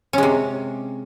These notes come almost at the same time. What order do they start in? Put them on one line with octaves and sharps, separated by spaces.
C#4 G#3 C3